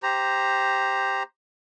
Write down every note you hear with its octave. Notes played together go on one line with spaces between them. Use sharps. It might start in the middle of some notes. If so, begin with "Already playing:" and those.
G4 C5 A#5